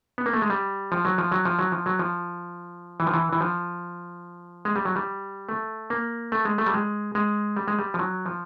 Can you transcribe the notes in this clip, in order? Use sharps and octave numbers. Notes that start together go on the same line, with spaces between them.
B3
A#3
A3
G#3
G3
F3
F#3
F3
F#3
F3
F#3
F3
F#3
F3
E3
F3
E3
E3
F3
G#3
G3
F#3
G3
A3
A#3
A3
G#3
A3
G3
G#3
G#3
G3
G#3
G3
F3
F#3
F3